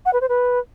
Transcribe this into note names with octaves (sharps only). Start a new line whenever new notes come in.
F#5
B4
C5
B4